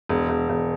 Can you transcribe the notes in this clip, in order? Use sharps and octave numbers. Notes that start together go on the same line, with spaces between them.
E1
E1
E1